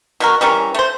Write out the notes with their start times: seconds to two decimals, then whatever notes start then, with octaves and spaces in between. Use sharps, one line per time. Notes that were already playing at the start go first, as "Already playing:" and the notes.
0.20 B2 F#4 A#4
0.41 E3 G3 C#4 A#4
0.74 A3 C5